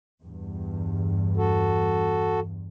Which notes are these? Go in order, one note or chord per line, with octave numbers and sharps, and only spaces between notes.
E2 G2
F#4 A4